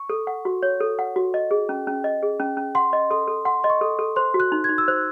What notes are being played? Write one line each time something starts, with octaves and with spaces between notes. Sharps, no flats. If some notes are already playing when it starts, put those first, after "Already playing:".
Already playing: C#6
A4
F#5
F#4
C#5
A4
F#5
F#4
D#5
G#4
C#4
C#4
D#5
G#4
C#4
C#4
F#5 C6
D#5
A4 C6
A4
F#5 C6
D#5 C6
C#6
A4
A4
C5 C6
F#4
F#6
D#4
D#4 G#6
E6
C5 F#6